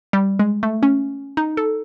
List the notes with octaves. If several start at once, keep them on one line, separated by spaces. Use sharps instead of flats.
G3
G#3
A3
C#4
D#4
A4